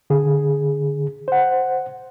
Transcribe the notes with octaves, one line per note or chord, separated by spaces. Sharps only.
D3 G#4
C5 F#5